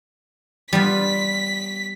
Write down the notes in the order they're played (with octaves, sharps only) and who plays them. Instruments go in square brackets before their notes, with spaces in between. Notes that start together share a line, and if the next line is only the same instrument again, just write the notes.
[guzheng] G3 B3 F4 [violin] B6